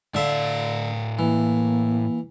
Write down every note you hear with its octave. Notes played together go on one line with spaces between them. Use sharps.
A2 D3 E5 F5
E3 A#3